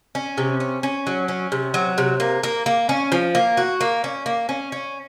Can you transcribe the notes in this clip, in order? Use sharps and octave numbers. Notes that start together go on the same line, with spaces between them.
C#4
C3
C#4
C#4
F#3
C#4
C3
F#3
C3
A#3
A#3
A#3
C#4
F3
A#3
F#4
A#3
C#4
A#3
C#4
C#4